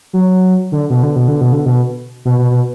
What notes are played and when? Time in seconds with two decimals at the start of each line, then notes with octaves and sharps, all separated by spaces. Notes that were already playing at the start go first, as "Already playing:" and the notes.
0.13 F#3
0.72 D3
0.90 B2
1.03 D3
1.16 B2
1.28 D3
1.41 B2
1.52 D3
1.66 B2
2.25 B2
2.39 B2
2.51 B2